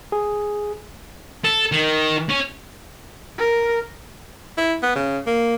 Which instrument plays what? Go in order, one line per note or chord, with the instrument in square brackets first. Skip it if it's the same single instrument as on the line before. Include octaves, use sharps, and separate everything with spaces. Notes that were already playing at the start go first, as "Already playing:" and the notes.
[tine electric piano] G#4
[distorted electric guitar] A4
D#3
C#4
[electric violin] A#4
[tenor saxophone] E4
B3
C#3
A#3